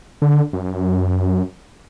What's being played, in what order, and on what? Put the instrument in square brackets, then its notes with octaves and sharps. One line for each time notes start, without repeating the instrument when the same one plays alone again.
[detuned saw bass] D3
F#2